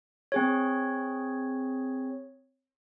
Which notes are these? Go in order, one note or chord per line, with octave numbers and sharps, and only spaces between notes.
C4 G#4 C#5